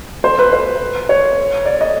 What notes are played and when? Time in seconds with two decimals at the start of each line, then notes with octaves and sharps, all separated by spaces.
0.24 C5
0.39 B4
0.53 C5
1.09 C#5
1.66 D5
1.81 D#5